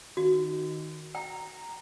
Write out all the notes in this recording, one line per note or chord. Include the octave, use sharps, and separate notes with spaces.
D#3 F#4
G5 A#5